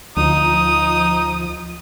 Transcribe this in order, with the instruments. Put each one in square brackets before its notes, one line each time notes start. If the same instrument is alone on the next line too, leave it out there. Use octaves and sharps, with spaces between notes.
[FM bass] D2 [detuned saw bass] F3 [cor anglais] D#4 [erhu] D#6